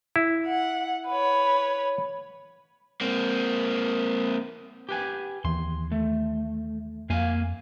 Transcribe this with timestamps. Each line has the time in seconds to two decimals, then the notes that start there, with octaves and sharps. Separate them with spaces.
0.16 E4
0.47 F#5
1.08 B4 C#5
3.01 A#3 C4
4.89 G4 B4 G#5
5.45 D#2 E3 C6
5.92 A3
7.10 F2 A#3 F5 G#5